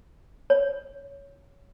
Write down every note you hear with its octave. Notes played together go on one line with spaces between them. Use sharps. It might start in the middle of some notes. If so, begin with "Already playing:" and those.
C#5